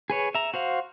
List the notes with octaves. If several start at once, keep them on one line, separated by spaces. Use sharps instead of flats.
G#4 B4 C#5
E5 A#5
F#4 C5 F5